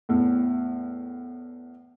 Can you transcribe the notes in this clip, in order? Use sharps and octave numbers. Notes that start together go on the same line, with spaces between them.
E2 A2